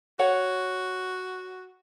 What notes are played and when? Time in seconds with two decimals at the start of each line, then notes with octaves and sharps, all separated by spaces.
0.19 F#4 C#5 F#5